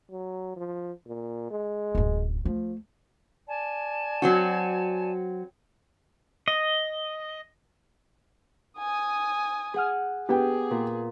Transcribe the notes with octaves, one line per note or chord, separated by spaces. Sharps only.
F#3
F3
A#2
G#3
D1 F#2
F3 A3
D5 G#5 A5
F#3 C4 F#4
D#5
G#5 D#6
G#4 F#5 F6
B3 G4 G#4 G5
A#2